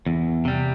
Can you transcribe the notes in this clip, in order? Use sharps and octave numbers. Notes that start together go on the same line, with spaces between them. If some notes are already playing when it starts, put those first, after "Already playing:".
E2
C3 G3